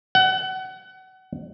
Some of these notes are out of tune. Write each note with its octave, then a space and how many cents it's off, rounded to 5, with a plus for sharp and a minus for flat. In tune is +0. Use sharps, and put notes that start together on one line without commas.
F#5 +30